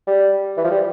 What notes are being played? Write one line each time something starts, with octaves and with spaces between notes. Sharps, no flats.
G3
E3
F3
G3